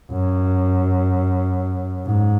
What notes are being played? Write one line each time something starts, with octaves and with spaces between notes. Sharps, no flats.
F#2
G#2